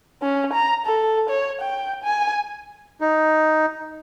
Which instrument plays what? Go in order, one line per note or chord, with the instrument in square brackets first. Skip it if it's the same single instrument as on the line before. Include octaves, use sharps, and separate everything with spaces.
[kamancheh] C#4
A#5
A4
C#5
G5
G#5
[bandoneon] D#4